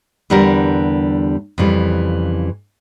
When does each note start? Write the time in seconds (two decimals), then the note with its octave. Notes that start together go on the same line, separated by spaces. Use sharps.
0.30 E2 D3 G3 D4 G4 A#4
1.58 F2 C#3 E3 G3